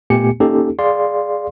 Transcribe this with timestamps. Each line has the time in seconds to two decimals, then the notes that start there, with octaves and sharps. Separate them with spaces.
0.10 A#2 A3 B3 G4 G#5 C#7
0.40 A#3 C#4 D#4 G4 A4
0.79 G#4 D5 F5 C6